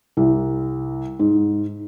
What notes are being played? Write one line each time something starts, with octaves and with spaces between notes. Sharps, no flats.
C2
G#2